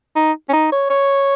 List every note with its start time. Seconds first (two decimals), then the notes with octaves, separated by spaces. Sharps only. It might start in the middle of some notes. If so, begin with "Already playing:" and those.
0.16 D#4
0.49 C#4
0.53 D#4
0.72 C#5
0.90 C#5